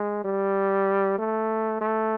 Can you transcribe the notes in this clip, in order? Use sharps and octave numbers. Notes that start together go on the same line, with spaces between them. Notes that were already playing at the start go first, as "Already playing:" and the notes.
Already playing: G#3
G3
A3
A3